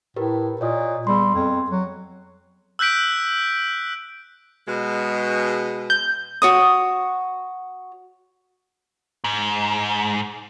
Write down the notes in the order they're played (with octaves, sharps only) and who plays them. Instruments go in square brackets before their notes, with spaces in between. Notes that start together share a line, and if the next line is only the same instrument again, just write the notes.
[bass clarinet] A2 [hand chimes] G4 A#4 B4
[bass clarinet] A#2 [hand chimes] C#5 D#5 D#6
[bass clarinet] G3 [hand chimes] B3 G#4 C6
[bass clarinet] F2
F#3
[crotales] E6 F#6 G6 B6 D7
[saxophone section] B2 G#3
[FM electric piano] G6
[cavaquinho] F#4 C#5 D#6
[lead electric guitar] G#2